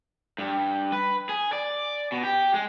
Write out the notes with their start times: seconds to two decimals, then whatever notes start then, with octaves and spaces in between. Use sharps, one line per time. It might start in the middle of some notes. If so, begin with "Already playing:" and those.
0.38 G2
0.92 B4
1.29 G#4
1.52 D5
2.12 B2
2.24 G4
2.54 G#3